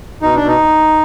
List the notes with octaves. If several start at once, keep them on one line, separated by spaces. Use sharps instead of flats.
B2 D#4
D4
B2
D#4